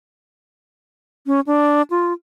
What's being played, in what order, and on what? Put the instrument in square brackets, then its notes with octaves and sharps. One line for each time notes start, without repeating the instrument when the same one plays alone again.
[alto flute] C#4
D4
F4